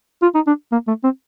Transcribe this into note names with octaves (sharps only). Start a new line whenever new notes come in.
F4
D#4
D4
A#3
A3
C4